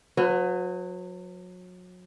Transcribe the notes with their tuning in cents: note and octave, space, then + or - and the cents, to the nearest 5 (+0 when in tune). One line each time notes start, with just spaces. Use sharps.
F#3 -30 B4 +25